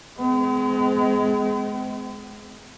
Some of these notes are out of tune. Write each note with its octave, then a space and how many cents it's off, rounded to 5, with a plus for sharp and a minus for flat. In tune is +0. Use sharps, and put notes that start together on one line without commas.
G#3 +20 C4 -45